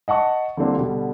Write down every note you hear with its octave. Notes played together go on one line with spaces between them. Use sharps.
D#5 F#5 A5 C#6
D3 E3 G3 A#3 C4 D4
B2 D3 G3